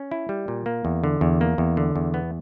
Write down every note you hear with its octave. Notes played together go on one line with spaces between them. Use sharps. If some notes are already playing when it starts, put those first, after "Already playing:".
Already playing: C#4
E4
G3
A#2
A#3
E2
D3
E2
A#3
E2
D3
E2
B3